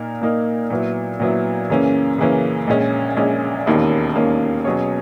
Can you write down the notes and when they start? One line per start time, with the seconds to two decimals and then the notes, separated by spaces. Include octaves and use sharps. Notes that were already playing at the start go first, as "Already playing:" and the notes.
Already playing: A#2 A#3 D#4 A#4
0.21 A#2 A#3 D#4 A#4
0.70 A#2 F#3 B3 E4
1.20 A#2 F#3 B3 E4
1.70 F#2 C#3 E3 A#3 C#4
2.18 F#2 C#3 E3 A#3 C#4
2.67 A#1 A#2 G#3 C#4
3.17 A#1 A#2 G#3 C#4
3.66 E1 D#2 D#3 A#3 C#4
4.16 E1 D#2 D#3 A#3 C#4
4.65 B2 F#3 C#4 G#4 C#5